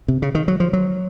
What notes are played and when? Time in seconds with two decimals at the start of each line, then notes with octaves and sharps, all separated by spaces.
0.08 C3
0.22 C#3
0.35 D#3
0.48 F#3
0.60 F3
0.73 F#3